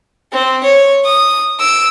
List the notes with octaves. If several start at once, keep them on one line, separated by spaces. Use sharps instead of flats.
C4
C#5
D#6
E6 D7